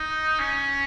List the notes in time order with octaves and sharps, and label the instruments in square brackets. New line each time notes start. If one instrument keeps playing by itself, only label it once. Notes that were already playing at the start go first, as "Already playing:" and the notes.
Already playing: [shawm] D#4
C#4